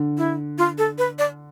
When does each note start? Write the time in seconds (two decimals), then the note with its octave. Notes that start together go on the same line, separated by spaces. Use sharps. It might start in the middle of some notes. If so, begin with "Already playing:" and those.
Already playing: D3
0.18 E4
0.58 F4
0.78 A4
0.98 B4
1.18 D5